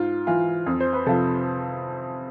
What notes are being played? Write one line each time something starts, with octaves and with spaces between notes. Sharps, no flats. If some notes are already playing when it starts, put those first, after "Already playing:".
Already playing: G#2 F4
E3 F4
F2
C5
B4
C3 F3 A4